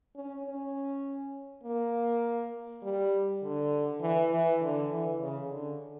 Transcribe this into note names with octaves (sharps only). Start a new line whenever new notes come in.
C#4
C#4
A#3
G3
D3
E3
E3
D3
E3
C#3
D3